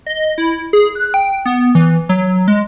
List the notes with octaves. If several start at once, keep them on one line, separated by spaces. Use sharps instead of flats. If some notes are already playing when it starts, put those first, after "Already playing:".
D#5
E4
G#4
F#6
G5
B3
E3
F#3
G#3